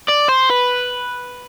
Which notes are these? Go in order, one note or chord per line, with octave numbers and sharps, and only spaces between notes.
D5
C5
B4